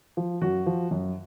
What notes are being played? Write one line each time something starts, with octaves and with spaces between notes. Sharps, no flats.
F3
F#2 F#4
F3
F#2